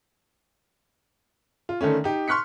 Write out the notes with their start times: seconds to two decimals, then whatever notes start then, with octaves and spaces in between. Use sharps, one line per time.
1.69 F4
1.81 D3 D#3 A3 C#4
2.04 D#4 G4
2.28 C6 C#6 F6 F#6 B6 C#7